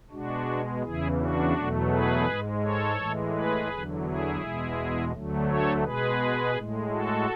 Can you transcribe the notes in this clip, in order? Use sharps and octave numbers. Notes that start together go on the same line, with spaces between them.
B2 G#3 D4 F#4
E2 C#3 E3 E4 G#4
D4 F#4
E2 B2 F#3 A3
G#4 B4
G#2 G#3
A4 C#5
A2 E3 G#3
G#4 B4
E2 D3 F#3
E4 G#4
E2 B2 G#3
D2 D3 F#3 A3
A4 C#5
B2 G#3 G#4 B4
A2 G#3
F#4 A4